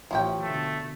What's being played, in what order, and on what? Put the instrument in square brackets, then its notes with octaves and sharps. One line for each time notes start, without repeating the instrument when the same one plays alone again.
[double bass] A1 [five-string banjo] F3 C#4 G5
[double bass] B2 D3 [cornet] A3